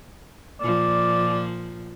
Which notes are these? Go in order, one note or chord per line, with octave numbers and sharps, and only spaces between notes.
A#2 F3 D5